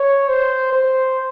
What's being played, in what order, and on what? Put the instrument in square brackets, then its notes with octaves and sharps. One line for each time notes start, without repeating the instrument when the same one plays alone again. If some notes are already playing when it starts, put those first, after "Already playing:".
Already playing: [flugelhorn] C#5
C5
C5